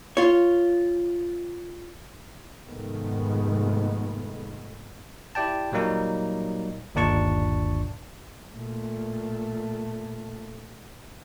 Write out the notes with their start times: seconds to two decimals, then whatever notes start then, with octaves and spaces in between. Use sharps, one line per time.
0.17 F4 C#5
2.68 F1 G#2 D#3 G#3 A3 B3
5.35 E4 G4 D5 G5 A5
5.72 A#2 F#3 G3 A#3 D#4
6.95 G1 D#2 A#2 D4 A5 C#6
8.54 A#2 A3